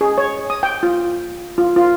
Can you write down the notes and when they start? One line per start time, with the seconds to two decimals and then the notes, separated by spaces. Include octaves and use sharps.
0.01 G#4
0.18 C#5
0.50 D#6
0.63 G5
0.83 F4
1.58 F4
1.76 F4